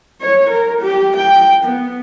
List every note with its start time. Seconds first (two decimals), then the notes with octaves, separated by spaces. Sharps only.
0.22 C#5
0.51 A#4
0.81 G4
1.17 G5
1.64 B3